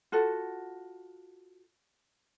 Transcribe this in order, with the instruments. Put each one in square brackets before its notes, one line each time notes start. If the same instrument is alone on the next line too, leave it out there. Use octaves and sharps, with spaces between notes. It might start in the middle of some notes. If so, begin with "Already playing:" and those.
[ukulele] F4 F#4 A4 F#5